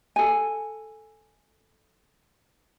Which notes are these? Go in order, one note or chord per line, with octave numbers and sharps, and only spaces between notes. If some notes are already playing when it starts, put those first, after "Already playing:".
A4 G#5